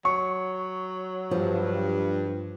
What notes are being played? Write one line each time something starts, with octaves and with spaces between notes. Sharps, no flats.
F#3 C#6
G2 F3